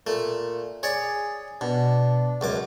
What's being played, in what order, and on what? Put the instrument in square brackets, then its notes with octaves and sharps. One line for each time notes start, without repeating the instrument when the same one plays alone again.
[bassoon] A#2 [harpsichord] A3
[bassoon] G#4 [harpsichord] C#5 D5
[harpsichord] B2 [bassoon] D4
[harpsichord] C#2 F#2 D6